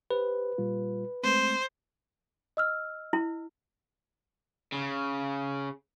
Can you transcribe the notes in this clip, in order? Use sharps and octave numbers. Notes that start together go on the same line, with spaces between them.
G4 B4 C5
A#2 G3 F4
G#3 A3 C4 C5
D#5 E6 F6
E4
C#3